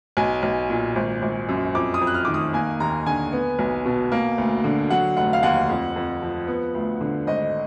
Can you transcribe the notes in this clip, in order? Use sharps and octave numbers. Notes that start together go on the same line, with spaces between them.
B1 G#5
B1
A#2
G#1
G#1
F#2
F2 D6
D#6
F2
F#6
F6
D#3 D6
D#6
A#3 G#5
D#2 A#5
D3 G#5
B3
B1
B2
A#3
D2
D3
F#3 F#5
F1 F#5
F5
D#2 F#5
F2
F2
F3
B3
D2
D3
G#1 D#5